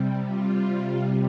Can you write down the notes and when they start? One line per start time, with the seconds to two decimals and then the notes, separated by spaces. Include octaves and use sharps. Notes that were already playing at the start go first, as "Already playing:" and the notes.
Already playing: C3 G3
0.26 F4